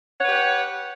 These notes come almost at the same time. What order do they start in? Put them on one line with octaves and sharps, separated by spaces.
F#5 C#5 B4 G4